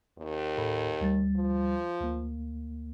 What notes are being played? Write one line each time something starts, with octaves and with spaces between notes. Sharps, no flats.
D#2
A2 A4 B5
D2 G3 A6
F3
D2 A#3